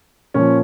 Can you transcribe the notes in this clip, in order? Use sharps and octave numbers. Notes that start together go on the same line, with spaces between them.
A#2 F3 C#4